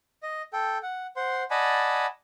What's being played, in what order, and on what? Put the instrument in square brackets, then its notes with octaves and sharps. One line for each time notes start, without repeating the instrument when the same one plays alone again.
[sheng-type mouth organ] D#5
A4 G5
F#5
C5 F#5 C6
D5 D#5 F#5 G#5 A5 B5